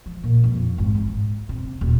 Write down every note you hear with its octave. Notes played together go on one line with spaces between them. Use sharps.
F3
A#2
F2
G#1
G#2
C3
D#1